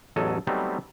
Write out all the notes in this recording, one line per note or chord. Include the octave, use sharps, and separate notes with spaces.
A1 E2 F#3 A4 D#5 G#5
F#3 G3 A3 B3 C4 D#4